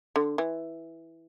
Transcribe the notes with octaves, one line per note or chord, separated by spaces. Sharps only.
D3
E3